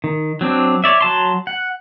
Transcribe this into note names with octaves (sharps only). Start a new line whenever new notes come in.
D#3
F#3 C4 D4
C#5 D5 E5
F#3 A5 C6
F#5